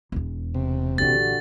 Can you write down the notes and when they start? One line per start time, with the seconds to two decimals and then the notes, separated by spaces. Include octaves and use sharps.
0.12 E1 E2
0.54 C3
0.98 A#1 D3 E3 F#4 G4 A6